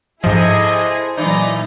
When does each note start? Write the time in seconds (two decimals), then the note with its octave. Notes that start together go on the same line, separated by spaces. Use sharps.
0.24 G#2 C3 F3 E4 G#4 A4 D#5
1.17 A#2 E3 F#3 D#4 D5 D#5